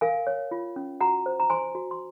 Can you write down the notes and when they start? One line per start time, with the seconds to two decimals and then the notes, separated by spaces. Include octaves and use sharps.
0.01 A#4 F5 G#5
0.27 C#5
0.51 F4
0.76 C#4
1.01 F#4 F#5 A#5
1.26 C5
1.40 A#5
1.50 C5 G#5 C6
1.75 F#4
1.91 C6